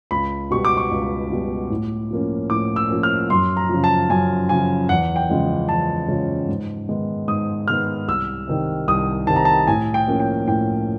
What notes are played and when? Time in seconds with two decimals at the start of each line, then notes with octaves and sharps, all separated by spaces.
0.11 C#2 B5
0.50 B2 G3 B3 C#6
0.65 D6
0.77 C#6
0.91 C#2
1.30 B2 G3 B3
1.70 A2
2.11 F3 A#3 C#4
2.50 A2 D6
2.76 E6
2.90 F3 A#3 C#4
3.03 F6
3.30 F#2 C6
3.57 A#5
3.69 C#3 F3
3.84 A5
4.10 F#2 G#5
4.49 C#3 F3 G#5
4.89 E2 F#5
5.16 G5
5.30 C#3 F3 G#3 C#4
5.69 E2 A5
6.08 C#3 F3 G#3 C#4
6.48 G#2
6.89 D#3 G#3 B3
7.28 G#2 D#6
7.68 D#3 G#3 B3 F6
8.08 C2 E6
8.47 C3 D#3 G3
8.88 C2 D#6
9.27 C3 D#3 G3 A5
9.36 A#5
9.45 A5
9.67 A2 G#5
9.94 G5
10.07 F3 A#3 C#4
10.20 G5
10.46 A2 G5